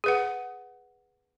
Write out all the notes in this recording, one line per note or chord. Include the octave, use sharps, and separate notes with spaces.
G#4 B4 F#5